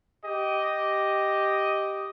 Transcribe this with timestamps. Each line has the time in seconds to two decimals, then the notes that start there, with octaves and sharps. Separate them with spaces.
0.24 G4 D#5